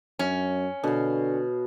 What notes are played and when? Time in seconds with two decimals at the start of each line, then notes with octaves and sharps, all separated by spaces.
0.19 F#2 C#4
0.84 B2 D3 F5